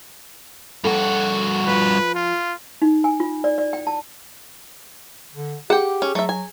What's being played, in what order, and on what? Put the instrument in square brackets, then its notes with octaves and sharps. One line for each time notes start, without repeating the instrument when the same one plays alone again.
[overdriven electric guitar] G2 F#4 [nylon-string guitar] A4
[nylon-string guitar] F3 [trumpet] B4
[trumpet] F4
[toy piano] D#4
G#5
F4
D5
D5
G5
A5
[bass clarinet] D3
[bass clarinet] G4 [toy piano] G#4 [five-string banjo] F#5 G5
[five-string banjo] C#4
[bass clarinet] F#3 [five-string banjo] A3 E5
[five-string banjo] G#5